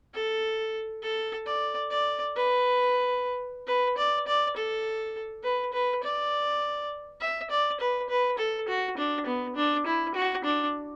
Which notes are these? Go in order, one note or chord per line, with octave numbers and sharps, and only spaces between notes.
A4
A4
D5
D5
B4
B4
D5
D5
A4
B4
B4
D5
E5
D5
B4
B4
A4
F#4
D4
B3
D4
E4
F#4
D4